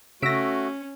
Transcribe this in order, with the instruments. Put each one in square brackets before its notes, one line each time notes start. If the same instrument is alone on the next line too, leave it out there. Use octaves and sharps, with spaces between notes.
[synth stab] C#3 A#6 [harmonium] A3 F#4 [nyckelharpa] C#4 [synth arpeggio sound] E6 B6 D7